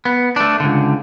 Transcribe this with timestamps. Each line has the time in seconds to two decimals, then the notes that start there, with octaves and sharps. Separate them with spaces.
0.05 B3
0.36 A3 D4
0.60 C#2 D3